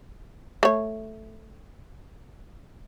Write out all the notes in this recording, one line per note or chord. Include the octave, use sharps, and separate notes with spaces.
A3 C#5